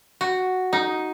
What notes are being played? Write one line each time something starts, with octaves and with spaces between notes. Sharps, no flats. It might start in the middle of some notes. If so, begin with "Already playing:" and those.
F#4
D#4